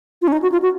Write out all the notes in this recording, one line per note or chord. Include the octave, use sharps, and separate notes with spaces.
F4
C#4
D#4
F#4
F4
F#4